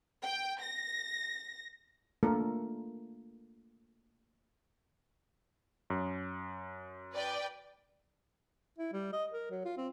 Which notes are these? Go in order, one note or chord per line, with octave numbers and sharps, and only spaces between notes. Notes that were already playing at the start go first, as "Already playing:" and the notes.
G5
A#6
A3 A#3 D4 F4 A4 A#4
F#2
B4 D5 G5
E4
G3
D#5
A#4
F#3
F4
C4